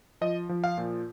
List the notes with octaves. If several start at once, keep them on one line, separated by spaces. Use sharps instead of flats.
F3 D#5
F3
F5
A#2